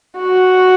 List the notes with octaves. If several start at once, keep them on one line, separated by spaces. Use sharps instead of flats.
F#4